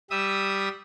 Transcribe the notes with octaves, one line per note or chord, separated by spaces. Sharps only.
G3 E5 D#6 E6